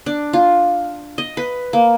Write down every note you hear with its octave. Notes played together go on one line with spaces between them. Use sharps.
D4
F4
D#5
B4
A#3